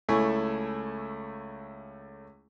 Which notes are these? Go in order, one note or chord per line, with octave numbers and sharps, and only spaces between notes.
C#2 A3 E4 A4 G#5 C#6